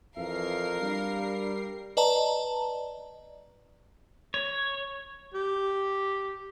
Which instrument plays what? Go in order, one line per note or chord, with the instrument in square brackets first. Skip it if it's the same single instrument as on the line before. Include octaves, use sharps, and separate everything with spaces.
[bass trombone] F2 [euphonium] E3 [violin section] A#4 C7 [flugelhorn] F5
[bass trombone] G3 [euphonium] D4
[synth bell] B4 D5 D#5 A5 A#5
[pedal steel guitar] C#5
[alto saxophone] G4